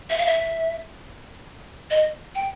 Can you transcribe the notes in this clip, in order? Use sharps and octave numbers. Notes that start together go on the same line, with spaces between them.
E5
F5
E5
D#5
G5